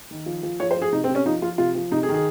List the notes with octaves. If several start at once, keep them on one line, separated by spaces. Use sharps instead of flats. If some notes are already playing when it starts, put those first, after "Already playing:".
D#3
F3
F3
F3 C#5
C5
F3
G#4
C3 D#4
C4
C3
C#4
F3 D#4
F3 F4
C3 F4
F3
C3 D#4
G#4
D#3
G#4